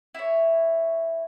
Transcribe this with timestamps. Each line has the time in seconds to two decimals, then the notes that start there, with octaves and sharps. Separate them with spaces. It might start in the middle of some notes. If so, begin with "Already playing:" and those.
0.14 E4 C#5